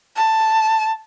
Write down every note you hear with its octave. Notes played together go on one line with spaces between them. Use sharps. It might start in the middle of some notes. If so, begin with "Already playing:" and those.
A5